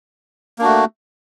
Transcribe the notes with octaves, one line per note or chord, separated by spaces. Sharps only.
A3 A#3 D4 F#4